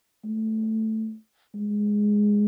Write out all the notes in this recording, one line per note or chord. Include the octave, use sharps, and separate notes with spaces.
A3
G#3